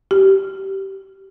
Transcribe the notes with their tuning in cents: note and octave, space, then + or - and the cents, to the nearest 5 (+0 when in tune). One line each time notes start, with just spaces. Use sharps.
G4 -20